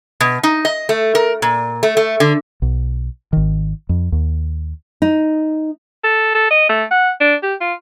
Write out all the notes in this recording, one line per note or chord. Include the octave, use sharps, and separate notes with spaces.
B2
D#4
D#5
A3
A#4
A#2
A3
A3
D3
B1
G#1 D#3
F2
D#2
D#4
A4
A4
D#5
A3
F#5
D4
G4
F4